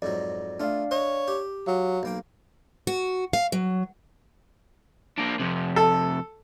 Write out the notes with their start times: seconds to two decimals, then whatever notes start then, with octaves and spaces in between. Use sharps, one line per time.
0.02 F2 G#2 F#3 D5
0.60 A3 D4 F4 D5 F5
0.91 C#5 D#5 F#5
1.28 G4
1.67 F#3 F5
2.03 B1 A#3 G5
2.87 F#4
3.33 F5
3.52 F#3
5.18 A#3 D4
5.40 F2 C3
5.76 A4